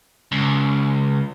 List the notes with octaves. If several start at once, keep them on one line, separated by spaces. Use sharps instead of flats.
C#2